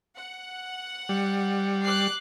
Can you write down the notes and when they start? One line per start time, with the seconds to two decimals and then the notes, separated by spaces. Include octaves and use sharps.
0.17 F#5
1.09 G3
1.84 D6 F#6 C7